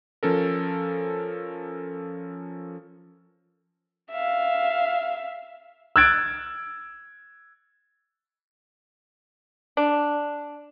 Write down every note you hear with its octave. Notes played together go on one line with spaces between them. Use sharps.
F3 C#4 A4 A#4
E5 F5
E6 F#6 G#6 A6 D7
D4